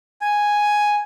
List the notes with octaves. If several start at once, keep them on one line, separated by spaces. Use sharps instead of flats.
G#5